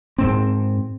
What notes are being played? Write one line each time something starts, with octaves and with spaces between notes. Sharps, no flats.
G#2 C4